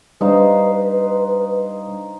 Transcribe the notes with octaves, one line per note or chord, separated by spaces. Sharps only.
G3 D4 D#4 B4 C5 F5